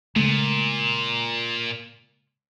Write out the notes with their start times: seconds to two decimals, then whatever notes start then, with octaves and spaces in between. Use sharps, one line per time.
0.16 A#2 C#3 G#3 A3